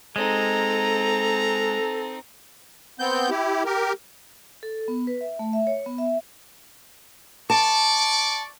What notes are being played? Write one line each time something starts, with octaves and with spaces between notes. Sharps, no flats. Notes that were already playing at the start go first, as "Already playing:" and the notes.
G#3 C4 D#4 A4 A#5
B3 C4 G6
E4 G4
G4 A#4
A4
B3
B4
E5
A3
E5
C#5
B3
E5
D5 A5 C#6 D6